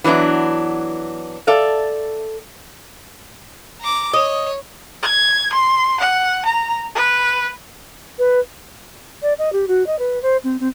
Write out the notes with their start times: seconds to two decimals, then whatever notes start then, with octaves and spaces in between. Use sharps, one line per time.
0.04 E3 F#3 B3 D4 E4
1.47 A4 D5 E5 F5
3.80 A#5 D6
4.13 C#5 D#5
5.02 G#6
5.52 C6
6.00 F#5
6.45 A#5
6.95 B4
8.19 B4
9.22 D5
9.39 D#5
9.53 G4
9.68 F#4
9.87 D#5
9.99 B4
10.22 C5
10.44 C4
10.60 C4